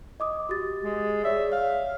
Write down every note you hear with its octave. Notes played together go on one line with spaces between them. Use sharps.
D#5 D6 D#6
F#4 G4 A6
G#3
G#4 C#5 D5 E5
C#5 F5